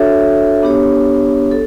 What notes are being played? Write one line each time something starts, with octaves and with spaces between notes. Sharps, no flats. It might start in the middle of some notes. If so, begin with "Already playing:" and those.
Already playing: D4 F#4 A4 C#5 E5
B3 D4 G4 C#5
A4